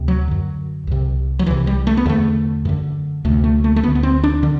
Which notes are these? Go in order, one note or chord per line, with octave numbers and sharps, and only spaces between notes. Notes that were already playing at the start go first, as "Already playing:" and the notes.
Already playing: D2 C3
F#3
F#2 D3
C2 C3
F#3
C2 C3 E3
G3
A3
B3
E2 D3 A3
F#2 D3
D2 C3 A3
A3
A3
A3
D2 D3 B3
B3
C4
D4
D3